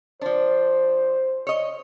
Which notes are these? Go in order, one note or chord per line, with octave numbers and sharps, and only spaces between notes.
F3 D4 C5
C#5 D#5